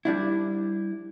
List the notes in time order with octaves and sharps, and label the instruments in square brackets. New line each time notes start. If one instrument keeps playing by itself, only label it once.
[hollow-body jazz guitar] G3 D4 E4